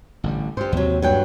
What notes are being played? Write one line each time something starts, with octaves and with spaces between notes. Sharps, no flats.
A1 D3 G3
G2 G4 C5
D#2 C3 F#3
G2 F#3 G5